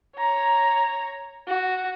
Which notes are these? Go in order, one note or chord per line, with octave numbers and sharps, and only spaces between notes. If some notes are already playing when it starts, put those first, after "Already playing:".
C#5 A#5
F#4